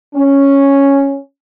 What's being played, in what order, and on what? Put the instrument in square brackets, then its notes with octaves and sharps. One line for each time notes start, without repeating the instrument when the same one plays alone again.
[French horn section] C#4